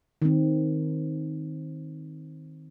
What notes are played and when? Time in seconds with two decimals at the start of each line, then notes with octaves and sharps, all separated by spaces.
0.22 D#3 C4